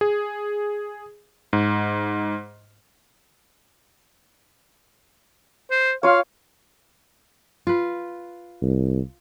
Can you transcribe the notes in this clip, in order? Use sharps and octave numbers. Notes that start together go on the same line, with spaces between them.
G#4
G#2
C5
F4 C#5 F5
F4 B4
C2